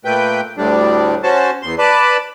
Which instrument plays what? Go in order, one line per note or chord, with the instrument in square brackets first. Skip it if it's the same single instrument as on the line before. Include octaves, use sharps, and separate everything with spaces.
[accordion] A#2 A3 B4 G5
D2 A2 G3 D4
C#4 F#4 C5 A5
E2 C6
B4 D5 A5 B5